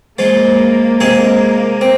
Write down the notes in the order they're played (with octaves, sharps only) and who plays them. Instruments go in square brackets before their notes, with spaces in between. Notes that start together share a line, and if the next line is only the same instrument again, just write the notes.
[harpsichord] F3 G#3 F4 [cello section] A#3
[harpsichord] C3 G#3 D#4 G#4
C4